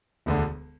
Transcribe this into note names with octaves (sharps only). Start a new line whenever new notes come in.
E1 D2 D3